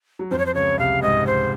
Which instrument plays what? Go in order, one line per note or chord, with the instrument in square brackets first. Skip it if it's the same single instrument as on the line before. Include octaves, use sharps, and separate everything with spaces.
[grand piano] F#3
[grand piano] F2 F3 [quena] C5
[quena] C#5
C5
[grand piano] C#2 C#3 [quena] C#5
[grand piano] C2 C3 [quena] F5
[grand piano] G#2 [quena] D#5
[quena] C5